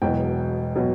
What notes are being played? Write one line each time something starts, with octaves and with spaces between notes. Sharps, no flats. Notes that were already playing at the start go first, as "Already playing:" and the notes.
E1 E2 B2 F#3 G5
B2 F#3